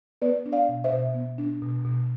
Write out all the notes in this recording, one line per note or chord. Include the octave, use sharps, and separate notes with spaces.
B3 B4 D5
D4
D5 F5
B2
C5 E5
B2
B3
D4
B2
B2